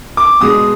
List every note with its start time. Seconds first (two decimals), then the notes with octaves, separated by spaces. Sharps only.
0.17 D6
0.41 B2 G#3 D#6